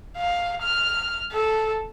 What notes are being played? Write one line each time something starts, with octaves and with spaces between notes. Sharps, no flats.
F5
F6
A4